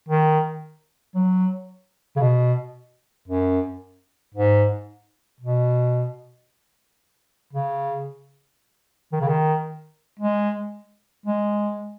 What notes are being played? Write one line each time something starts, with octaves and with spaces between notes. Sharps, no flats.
D#3
F#3
C#3
B2
F#2
G#2
B2
C#3
D#3
C#3
D#3
G#3
G#3